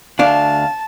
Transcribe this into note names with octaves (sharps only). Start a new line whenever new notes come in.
D2 D4 D5 F5 A5